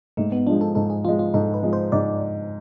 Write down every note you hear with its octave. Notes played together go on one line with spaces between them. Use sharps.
G#2 A3
B3
F3 G#3 D4
A4
G#2 A4
G#4
F3 G#3 F4
F4
G#2 A4
B4
F3 G#3
C5
G#2 D5